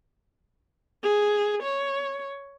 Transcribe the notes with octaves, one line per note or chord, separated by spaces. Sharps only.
G#4
C#5